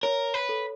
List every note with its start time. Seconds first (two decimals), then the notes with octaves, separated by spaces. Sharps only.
0.03 A#4 C#5
0.34 B4
0.49 A4